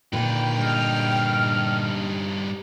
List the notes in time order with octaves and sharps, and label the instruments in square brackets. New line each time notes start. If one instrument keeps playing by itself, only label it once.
[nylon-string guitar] A#2 D3 [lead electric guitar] D#3 B4 [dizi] G5
[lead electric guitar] G2 D#4 [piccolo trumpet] F6